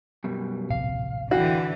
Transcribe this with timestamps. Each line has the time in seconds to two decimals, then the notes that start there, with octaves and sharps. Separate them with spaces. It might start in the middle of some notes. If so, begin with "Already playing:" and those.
0.24 F#2 B2 G3
0.70 D1 A#1 C3 F5
1.31 D3 E3 E4 F#4 F5 G5